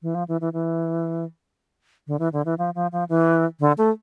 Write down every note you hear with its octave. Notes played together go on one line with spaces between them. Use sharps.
E3
F3
E3
E3
E3
D3
E3
D3
E3
F3
F3
F3
E3
D3
A3